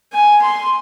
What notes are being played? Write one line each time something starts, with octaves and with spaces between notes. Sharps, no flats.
G#5
C6